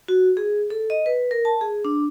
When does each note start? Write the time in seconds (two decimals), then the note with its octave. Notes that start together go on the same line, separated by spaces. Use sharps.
0.08 F#4
0.37 G#4
0.70 A4
0.90 D#5
1.06 B4
1.31 A#4
1.45 A5
1.61 G#4
1.85 D4